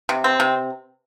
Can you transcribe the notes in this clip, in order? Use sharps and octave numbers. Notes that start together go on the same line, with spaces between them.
C3
C4
C3